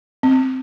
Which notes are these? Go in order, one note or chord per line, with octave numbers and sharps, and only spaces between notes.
C4